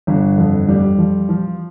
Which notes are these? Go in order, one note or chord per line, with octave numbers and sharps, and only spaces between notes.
G1
F2
G3
F3
F3